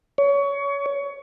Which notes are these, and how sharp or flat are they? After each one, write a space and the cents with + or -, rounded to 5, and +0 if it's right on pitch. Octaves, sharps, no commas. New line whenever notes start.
C#5 +25